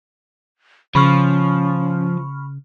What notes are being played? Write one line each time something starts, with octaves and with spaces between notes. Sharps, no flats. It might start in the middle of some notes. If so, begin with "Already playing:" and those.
C#3 F3 C#4 B5 C#6 F6